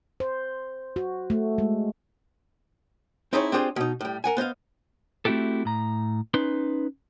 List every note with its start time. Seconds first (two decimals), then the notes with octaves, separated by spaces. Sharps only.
0.20 C5
0.96 F#4
1.30 A3
1.58 G#3
3.33 C4 D#4 E4 G#4 A4 C#5
3.52 C4 D4 F4 G4 G#4 C5
3.76 B2 D#4
4.01 A2 G3
4.24 A#4 F#5 G#5
4.37 B3 C5 D#5 F5
5.25 A3 C4 E4 F#4 G4 A4
5.65 A2 A#5
6.34 C#4 D#4 B4 C6